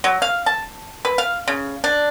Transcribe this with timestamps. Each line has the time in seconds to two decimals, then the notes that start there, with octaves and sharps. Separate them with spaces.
0.04 F#3
0.22 F5
0.46 A5
1.05 B4
1.18 F5
1.48 C#3
1.84 D4